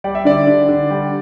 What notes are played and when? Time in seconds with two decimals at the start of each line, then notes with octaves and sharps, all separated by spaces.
0.04 G3 D5
0.15 E5
0.25 D3 D5
0.47 D3
0.69 D3
0.90 G3